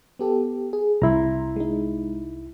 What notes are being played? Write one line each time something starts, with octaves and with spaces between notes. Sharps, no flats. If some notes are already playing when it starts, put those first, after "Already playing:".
B3 G4 A4
G#4
C2 E4 A#5 C6
G#3 D#4